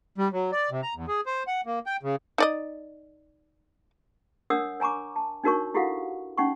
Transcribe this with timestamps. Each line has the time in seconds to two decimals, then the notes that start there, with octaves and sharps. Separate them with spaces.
0.18 G3
0.33 F#3
0.52 D5
0.71 C3
0.83 A#5
0.95 E2
1.08 G#4
1.26 C5
1.47 F#5
1.66 A#3
1.86 G5
2.03 C#3
2.38 D#4 D5 D#5
4.50 D4 A#4 C#5 F#5 D#6 E6
4.80 C#5 G#5 A#5 C#6 D6
5.16 A5
5.44 D4 D#4 F#4 A#4 C#5 C#6
5.74 E4 F#4 G4 A4 F5 F#5
6.38 C#4 D#4 F#5 B5 C#6